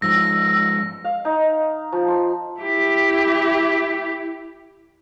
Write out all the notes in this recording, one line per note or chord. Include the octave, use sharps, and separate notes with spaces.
G#2 F3 E6 A#6
F5
D#4
F3
C6
E4 G4